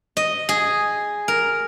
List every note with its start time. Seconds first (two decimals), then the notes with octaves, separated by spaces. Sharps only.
0.17 D#5
0.49 G#4
1.28 A#4